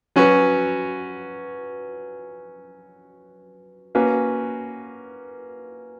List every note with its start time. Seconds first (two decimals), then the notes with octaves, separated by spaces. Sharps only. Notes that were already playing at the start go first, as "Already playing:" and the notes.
0.16 F#3 C#4 F#4 B4
3.95 A#3 C#4 F#4 B4